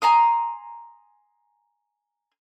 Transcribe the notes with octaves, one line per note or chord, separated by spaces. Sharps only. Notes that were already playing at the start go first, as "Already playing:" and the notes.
G#5 A#5 C6 D#6